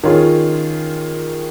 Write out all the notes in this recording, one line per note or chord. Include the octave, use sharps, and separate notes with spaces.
D#3 C#4 F4 G#4